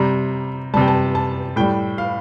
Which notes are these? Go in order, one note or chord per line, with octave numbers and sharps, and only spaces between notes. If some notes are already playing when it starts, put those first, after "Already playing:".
Already playing: C3 G3 A#5
C3 G3 G5 A5
A5
A5
A2 G3 G5
F5